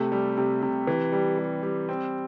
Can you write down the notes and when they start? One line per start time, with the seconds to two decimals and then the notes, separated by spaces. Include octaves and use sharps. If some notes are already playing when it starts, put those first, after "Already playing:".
Already playing: C3 A3
0.12 G3
0.37 C3
0.62 C3
0.87 E3
1.13 G3
1.38 G3
1.63 G3
1.89 C4